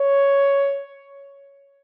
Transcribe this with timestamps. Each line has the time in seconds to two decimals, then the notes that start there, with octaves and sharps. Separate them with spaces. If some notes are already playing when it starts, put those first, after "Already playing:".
Already playing: C#5